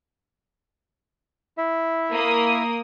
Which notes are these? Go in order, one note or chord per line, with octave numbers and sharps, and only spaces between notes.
E4 E5
A#3 D#6